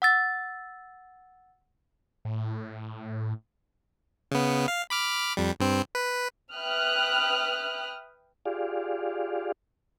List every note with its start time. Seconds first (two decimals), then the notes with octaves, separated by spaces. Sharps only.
0.02 F#5 E6 A6
2.25 A2
4.31 C#3 B3
4.68 F5
4.90 B5 D6 F6
5.37 F2 G3
5.60 G2 C4
5.95 B4
6.54 B4 E5 G5 D#6 F6 F#6
8.46 F4 G4 G#4 D5 F5